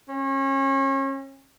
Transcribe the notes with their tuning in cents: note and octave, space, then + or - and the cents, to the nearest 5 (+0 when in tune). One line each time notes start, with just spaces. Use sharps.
C#4 -35